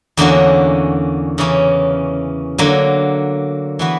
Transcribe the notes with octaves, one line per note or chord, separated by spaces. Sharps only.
E2 D3 A#3 C#4 F#4
C#3 E3 A#3 C#4
D3 F#3 A#3
E3 B3 F#4